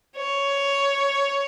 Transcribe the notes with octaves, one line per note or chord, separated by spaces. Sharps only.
C#5